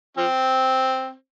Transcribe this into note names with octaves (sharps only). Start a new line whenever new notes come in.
F3 C4